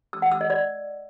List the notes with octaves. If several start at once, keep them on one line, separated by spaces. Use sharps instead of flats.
E6
F#5
E6
D#5
D5